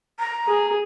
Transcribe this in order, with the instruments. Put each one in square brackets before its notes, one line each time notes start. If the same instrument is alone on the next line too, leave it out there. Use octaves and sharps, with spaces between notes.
[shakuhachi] A#5
[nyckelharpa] G#4